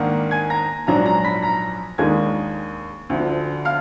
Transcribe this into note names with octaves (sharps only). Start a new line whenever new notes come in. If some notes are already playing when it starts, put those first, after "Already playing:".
Already playing: G#2 D#3 A#3 D4 F#5
G#5 G#6
A#5 A#6
A#1 G#2 F#3 D4 A#5 A#6
A#5 A#6
B5 B6
A#5 A#6
D#2 D#3 G#3 D4 G#5 G#6
D2 D3 F3
F5 F6